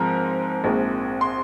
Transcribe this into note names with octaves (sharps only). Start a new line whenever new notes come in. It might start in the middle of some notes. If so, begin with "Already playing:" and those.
Already playing: G#2 F3 G#3 C4 A#4 A#5
A#1 G#2 G#3 C4
C6